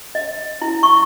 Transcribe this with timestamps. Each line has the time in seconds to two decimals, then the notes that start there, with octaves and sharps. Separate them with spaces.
0.15 D#5
0.62 E4
0.83 C#6